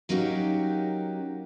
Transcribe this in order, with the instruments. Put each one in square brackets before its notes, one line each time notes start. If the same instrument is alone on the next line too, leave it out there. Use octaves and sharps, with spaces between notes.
[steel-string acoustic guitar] F#3 A#3 C#4 D#4 F#4 G4